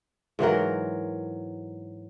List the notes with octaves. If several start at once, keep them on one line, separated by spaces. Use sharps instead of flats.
G#2 E3 F#3 A#4